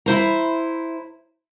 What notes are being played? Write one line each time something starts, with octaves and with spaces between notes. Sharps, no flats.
E4 C5 A#5